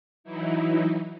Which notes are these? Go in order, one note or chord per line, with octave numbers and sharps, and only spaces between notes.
E3 F#3 D#4 E4